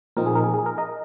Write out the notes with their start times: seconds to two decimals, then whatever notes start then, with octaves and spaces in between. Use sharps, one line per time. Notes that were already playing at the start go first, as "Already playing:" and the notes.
0.17 A#2 F3 C4 D#4 A#4
0.26 G#4
0.35 A#4
0.44 G#4
0.54 G#4
0.66 A#4
0.78 A#4 D#5